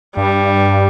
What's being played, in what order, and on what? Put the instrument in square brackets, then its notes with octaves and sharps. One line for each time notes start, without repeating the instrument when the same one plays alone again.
[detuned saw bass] G2 [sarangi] G3